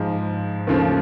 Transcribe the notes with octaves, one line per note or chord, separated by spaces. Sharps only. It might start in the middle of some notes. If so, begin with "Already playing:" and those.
Already playing: G#2 F3 G#3
D#2 C#3 F3 A3